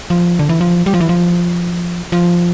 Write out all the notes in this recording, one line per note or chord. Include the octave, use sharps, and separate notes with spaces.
F3
D3
E3
F3
G3
F3
E3
F3
F3